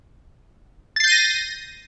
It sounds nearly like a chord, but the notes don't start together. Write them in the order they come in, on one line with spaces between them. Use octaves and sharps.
A6 C7 G6 D#7 A#6